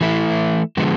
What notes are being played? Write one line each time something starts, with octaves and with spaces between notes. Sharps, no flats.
E3 A3 E4
D3 F3 G#3 B3